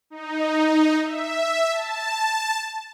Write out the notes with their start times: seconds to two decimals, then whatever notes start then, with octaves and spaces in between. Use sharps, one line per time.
0.10 D#4
1.03 E5
1.71 A5